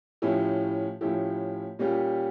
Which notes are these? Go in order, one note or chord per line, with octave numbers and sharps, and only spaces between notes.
A2 F3 C#4 E4 G4
A2 F3 C#4 E4 G4
A#2 G3 C#4 G4